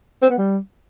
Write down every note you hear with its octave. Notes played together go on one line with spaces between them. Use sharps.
C4
B3
G3